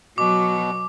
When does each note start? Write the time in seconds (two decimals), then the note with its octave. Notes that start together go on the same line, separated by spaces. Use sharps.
0.18 B2 F#3 D6